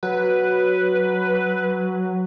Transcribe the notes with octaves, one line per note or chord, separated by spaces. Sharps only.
F#3 B4